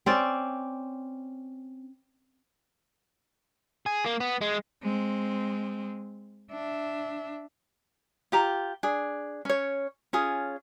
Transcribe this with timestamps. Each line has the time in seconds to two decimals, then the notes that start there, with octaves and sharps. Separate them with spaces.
0.06 C4 C#4 D5
3.86 G#4
4.05 A#3
4.20 B3
4.41 G#3
4.82 G#3 C4
6.51 D4 E5
8.32 F4 G4 A#5
8.83 D4 G#4
9.45 C#4 C#5
10.13 C#4 F4 G#4